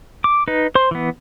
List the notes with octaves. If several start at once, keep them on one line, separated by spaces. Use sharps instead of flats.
D6
D#4 B4
C5 C6
E3 B3